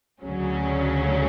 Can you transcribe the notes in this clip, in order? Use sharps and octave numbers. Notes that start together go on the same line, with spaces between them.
D2 C#3 F#3 C#4